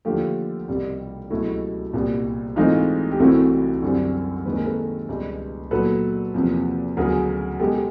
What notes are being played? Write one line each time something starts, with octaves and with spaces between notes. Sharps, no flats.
D#2 D3 F3 A3 F4 G4
C2 B2 G3
C#2 B2 F#3 A3 E4 F#4
C2 A#2 G3 B3
G#2 E3 A3 C4 D#4 F4
G4
C2 C3 E3 A3 C4 E4 F#4
F#2 D3 G3 C4
D#2 D#3 G#3 C4 B4
A#4
A4 B4
C#2 B2 G3
A#2 F#3 B3 A4 B4
E2 C3 F3 A#3
D2 C#3 F#3 B3 G#4 A#4
B2 G#3 B3 G4 A4